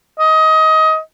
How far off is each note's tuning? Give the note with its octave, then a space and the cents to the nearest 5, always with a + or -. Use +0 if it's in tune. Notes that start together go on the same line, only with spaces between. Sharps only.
D#5 +20